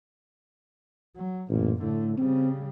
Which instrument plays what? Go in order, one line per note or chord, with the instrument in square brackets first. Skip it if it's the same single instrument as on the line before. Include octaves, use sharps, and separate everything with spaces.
[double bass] F#3
[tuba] A1 [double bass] F#2 A#2
[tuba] A2 [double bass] D3 A3
[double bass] C#3 G3 [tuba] C4